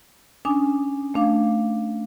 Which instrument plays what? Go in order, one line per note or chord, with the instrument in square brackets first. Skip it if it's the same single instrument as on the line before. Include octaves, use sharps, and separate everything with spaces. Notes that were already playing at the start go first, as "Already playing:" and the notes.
[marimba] C#4 D4 G#5 D6 D#6
A3 D4 F5 D6